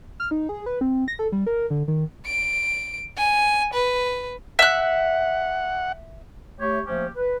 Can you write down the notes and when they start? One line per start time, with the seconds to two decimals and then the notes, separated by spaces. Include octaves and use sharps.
0.20 F6
0.31 D#4
0.49 G#4
0.66 B4
0.81 C4
1.08 A#6
1.19 A4
1.32 G3
1.47 A#4
1.70 D3
1.88 D#3
2.26 D7
3.17 G#5
3.74 B4
4.59 E5 F#5 F#6
6.60 A3 G4 C#5
6.87 F3 A3 A#3 C#4 G4 C5
7.16 B4